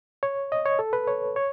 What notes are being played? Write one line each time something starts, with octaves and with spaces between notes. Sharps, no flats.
C#5
D#5
C#5
A4
B4
C#5
C#5